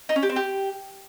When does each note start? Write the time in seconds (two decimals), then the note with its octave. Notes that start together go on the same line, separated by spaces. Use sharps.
0.09 D#4
0.16 C#4
0.23 G4
0.29 C4
0.36 G4